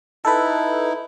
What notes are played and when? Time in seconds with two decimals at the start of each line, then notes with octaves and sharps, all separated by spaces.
0.25 D#4 E4 A4 B4